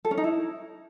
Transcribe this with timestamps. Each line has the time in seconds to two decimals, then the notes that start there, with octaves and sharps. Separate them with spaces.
0.05 A4
0.11 C#4
0.17 D#4
0.24 E4